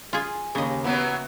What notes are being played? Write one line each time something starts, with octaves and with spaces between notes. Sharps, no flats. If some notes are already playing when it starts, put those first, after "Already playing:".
F4 G#4 G#5
D#2 C#3 D#4 D#5 A#5
E3 F#3 B3 E4 B4 F#5